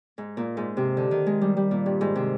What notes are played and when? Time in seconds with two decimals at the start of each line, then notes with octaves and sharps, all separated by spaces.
0.18 G#2
0.37 A#2
0.57 G#2
0.77 C3
0.97 D3
1.11 D#3
1.26 G#3
1.41 G3
1.57 G3
1.71 A#2
1.86 G2
2.01 G#2
2.15 C3